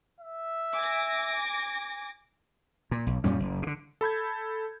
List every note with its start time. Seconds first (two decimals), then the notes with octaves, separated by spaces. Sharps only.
0.20 E5
0.77 G#5 D6 A#6
2.91 A#2
3.07 B1
3.24 F#2 A#2 G3 C#4
3.39 F#1
3.62 B2 D3
4.01 A4 B5 G6 G#6